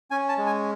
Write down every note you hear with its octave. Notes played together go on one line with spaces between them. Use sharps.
C#4 G#5
A5
G#3
G#5